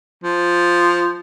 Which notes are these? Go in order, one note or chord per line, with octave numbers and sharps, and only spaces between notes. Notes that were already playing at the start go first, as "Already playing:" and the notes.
F3